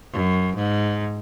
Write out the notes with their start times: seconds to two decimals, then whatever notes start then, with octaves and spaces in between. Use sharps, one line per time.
0.13 F#2
0.56 G#2